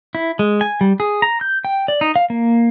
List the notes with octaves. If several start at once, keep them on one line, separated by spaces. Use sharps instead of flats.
E4
G#3
G#5
G3
G#4
A#5
G6
G5
D5
D#4
F5
A#3